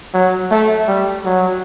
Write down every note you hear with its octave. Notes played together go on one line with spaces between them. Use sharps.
F#3
A3
G3
F#3